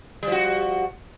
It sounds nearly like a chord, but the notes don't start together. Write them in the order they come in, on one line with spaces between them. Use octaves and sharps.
G3 F3 F#4